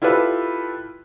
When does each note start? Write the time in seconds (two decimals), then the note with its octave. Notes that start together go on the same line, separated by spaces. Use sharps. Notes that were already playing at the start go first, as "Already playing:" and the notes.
0.02 E4 F4 G4 A4 B4